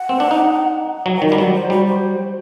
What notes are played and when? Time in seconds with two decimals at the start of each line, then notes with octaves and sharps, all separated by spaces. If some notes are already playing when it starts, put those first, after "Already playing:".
Already playing: F#5
0.09 C4
0.20 D4
0.31 D#4
1.06 F#3
1.17 G5
1.22 D#3
1.28 D5
1.32 G3
1.38 F#3 D5
1.54 C5
1.70 G3 F#4
1.86 C5